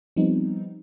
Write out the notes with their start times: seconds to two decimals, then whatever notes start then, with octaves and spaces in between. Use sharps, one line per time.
0.16 F3 G3 B3 C4 D#4